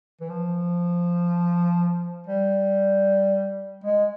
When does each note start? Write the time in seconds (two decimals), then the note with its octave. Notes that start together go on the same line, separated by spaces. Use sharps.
0.21 E3
0.29 F3
2.27 G3
3.84 G#3